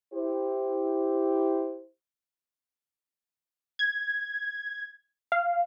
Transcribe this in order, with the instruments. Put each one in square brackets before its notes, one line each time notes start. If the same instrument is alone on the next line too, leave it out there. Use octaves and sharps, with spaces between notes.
[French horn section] E4 G4 C5
[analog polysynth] G#6
F5